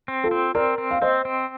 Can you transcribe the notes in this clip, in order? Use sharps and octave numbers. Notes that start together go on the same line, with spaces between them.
C4
F4 A4
C4
C4 A#4 D5
C4
F5
C4 C5 D#5
C4